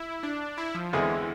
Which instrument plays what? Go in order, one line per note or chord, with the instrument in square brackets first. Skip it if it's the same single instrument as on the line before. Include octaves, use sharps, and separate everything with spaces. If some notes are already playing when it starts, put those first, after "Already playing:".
Already playing: [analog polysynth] E4
D4
E4
F3
[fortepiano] E2 D3 G#3 C4 G#4 [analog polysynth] E3